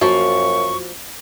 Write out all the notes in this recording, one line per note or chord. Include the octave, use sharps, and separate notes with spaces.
F#2 F3 A#3 F#4 C#6